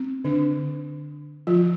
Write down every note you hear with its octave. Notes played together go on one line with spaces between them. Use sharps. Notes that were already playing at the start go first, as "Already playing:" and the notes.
Already playing: C4
D3 D4
F3 F4